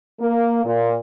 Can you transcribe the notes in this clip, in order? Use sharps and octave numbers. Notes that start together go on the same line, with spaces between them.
A#3
A#2